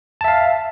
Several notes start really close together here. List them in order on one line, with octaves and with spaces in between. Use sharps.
A5 E5 F5